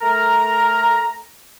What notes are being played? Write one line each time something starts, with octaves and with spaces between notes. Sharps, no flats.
A3 A#4 A#5